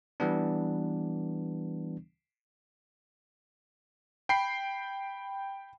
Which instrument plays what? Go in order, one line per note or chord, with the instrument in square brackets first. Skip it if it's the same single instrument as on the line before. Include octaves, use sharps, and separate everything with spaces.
[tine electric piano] E3 G3 B3 D4
[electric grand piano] G5 B5 C7